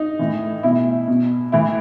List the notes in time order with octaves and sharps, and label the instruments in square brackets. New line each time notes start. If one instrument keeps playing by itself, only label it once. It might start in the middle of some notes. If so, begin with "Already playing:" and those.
Already playing: [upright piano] D#4
A2 E3
B2 E4
B2
A2 E3 E4